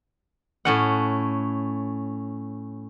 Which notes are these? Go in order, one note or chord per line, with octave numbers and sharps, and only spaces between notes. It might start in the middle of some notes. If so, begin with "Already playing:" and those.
A2 C#4 F#5